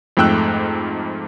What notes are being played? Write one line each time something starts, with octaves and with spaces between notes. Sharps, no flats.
F2 G#2 A3 G5 E6 F#6